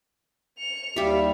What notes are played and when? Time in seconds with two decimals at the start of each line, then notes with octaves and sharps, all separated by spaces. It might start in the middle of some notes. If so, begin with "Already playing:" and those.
0.58 C#7 F7
0.96 D#2 G3 G4 E5 F5